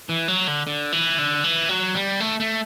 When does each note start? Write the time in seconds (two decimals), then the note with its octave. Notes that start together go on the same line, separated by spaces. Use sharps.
0.09 E3
0.28 F#3
0.48 D3
0.67 D3
0.92 E3
1.18 D3
1.44 E3
1.69 F#3
1.95 G3
2.20 A3
2.40 A3